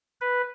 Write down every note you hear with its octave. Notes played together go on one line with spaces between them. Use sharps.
B4